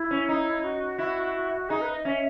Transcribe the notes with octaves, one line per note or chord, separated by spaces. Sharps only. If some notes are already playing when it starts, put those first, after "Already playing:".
Already playing: E4
C#4
D#4
F#4
E4
D#4 G#4
B4
D#5
C#4 E5